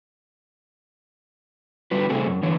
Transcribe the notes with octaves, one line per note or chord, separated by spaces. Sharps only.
D3 G3 F#4 B4
C3 G3 A3 C4 G#4 A4
F#2
D3 E3 C#5